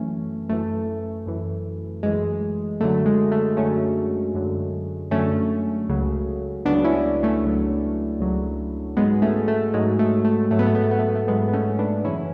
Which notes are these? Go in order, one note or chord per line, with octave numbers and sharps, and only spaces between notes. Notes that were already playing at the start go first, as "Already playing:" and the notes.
Already playing: F#2 E3 A3 C#4
F#2 E3 A3
F#2 E3
F#2 E3 G#3
F#2 D3 F#3 A3
G#3
A3
F#2 D3 F#3 A3 C#4
F#2 D3 F#3
F#2 D3 F#3 A3 C#4
C#2 C#3 F#3
C#2 C#3 F#3 B3 D4
C#4 E4
A3 C#4
C#2 C#3 F#3
C#2 C#3 F#3
G#2 F#3 G#3 B3
A3 C#4
A3
G#2 F#3 G#3
A3
A3
G#2 F#3 A3
B3
A3
B3
A3
B3
A3
B3
A3
G#2 F#3 G#3 B3
B3
A3 C#4
B3 D4
F#2 C#3 E3 C#4 E4